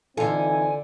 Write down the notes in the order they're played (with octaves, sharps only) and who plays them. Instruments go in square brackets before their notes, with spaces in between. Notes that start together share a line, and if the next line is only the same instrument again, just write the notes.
[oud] D3 F4 [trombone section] E3 C4 D#4 [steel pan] A4 [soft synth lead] G#5